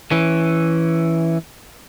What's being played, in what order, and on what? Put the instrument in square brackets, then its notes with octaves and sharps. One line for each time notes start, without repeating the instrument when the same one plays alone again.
[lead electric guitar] E3 C#4